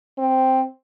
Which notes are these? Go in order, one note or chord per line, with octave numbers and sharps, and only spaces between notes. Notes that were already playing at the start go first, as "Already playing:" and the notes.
C4